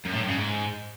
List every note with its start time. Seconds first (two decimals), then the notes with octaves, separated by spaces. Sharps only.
0.05 F#2
0.13 A2
0.20 G2
0.28 C#3
0.36 G#2